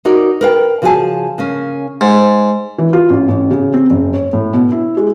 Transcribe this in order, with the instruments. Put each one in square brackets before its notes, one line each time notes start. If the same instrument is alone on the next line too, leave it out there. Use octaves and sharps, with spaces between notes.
[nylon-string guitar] D#4 F#4 A#4 C#5 D5
A#4 B4 F5 G5
C#3 F3 F#4 G#4 G#5 A5
C#3 A#3 C#4
[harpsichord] G#2
[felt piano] E3
F4
A1
A1
C#3
C4
F#1
C#5
A2
B2
E4
G#3